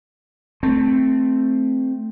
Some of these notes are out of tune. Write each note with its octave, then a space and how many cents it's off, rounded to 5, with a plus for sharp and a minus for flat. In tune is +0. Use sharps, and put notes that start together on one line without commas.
A3 +0 C4 +0